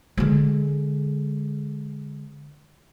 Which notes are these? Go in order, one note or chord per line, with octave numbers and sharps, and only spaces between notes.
D3 G#3